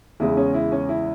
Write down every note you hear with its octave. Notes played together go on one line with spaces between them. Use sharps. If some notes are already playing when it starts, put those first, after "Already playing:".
E2 C#3 G#3 E4
C#4
E4
C#4
E4